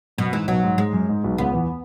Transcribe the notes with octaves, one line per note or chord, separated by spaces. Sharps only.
F#2 B2
G#2 E3
B1 B2 F#3
G#2
G#2 G#3
F#2
G#2
B1 B2
C#2 C#3 B3
E2 E3